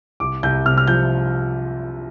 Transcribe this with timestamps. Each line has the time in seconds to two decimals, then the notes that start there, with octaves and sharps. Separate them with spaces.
0.20 C2 D6
0.43 C2 G6
0.66 C3 F6
0.78 F6
0.87 F3 G6